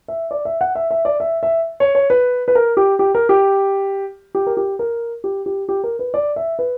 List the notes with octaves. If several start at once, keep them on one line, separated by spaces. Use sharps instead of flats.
E5
D5
E5
F#5
E5
E5
D5
E5
E5
C#5
C#5
B4
B4
A#4
G4
G4
A#4
G4
G4
A#4
G4
A#4
G4
G4
G4
A#4
B4
D5
E5
B4